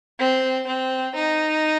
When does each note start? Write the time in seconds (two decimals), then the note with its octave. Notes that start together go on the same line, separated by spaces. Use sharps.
0.19 C4
0.66 C4
1.15 D#4